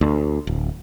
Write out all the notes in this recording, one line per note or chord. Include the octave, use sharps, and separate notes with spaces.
D2
D1